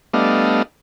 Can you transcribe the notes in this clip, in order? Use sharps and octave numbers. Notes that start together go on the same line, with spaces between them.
G3 A3 B3 D4 D#5 F5